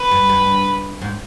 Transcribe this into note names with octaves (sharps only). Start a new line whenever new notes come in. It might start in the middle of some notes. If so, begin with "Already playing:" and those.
Already playing: B4
G2
G2
G#2